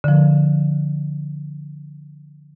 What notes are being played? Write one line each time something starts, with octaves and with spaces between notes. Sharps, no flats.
D3 F3